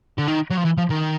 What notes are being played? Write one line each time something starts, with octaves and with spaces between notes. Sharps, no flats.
D3
D#3
F#3
F3
E3
F3
D#3